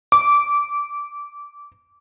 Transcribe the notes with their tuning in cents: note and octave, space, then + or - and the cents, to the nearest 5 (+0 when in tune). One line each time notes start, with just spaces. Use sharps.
D6 -20